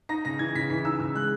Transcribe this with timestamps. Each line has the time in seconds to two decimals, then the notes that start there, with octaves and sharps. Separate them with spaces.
0.09 D#4 A#6
0.25 C#3 A#6
0.39 E3 G#6
0.55 C#3 B6
0.70 E3 B6
0.85 D#4 E6
1.00 C#3 E6
1.15 G#3 F#6